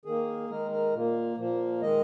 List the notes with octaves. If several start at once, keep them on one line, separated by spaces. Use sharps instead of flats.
D#3 A#3 G#4
D#3 G#3 A#4
A#4
A#2 A#3
A#2 F3 A#3
D#3 G#3 D#5